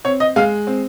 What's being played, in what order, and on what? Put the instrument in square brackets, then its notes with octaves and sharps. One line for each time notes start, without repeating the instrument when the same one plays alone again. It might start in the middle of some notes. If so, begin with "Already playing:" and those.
[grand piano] C4 C#5
D#5
G#3 F5
C4